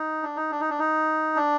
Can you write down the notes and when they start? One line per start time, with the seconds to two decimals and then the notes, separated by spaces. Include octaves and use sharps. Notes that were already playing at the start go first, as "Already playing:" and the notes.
Already playing: D#4
0.23 D4
0.36 D#4
0.51 D4
0.60 D#4
0.70 D4
0.79 D#4
1.36 D4